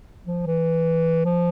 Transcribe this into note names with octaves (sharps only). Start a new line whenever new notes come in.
F3
E3
F3